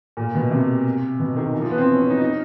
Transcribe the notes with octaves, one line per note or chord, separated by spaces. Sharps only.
A#2
B2
C3
B2
D#3
E3
F3
B3
C4
C#4
C#4
D#4
D#4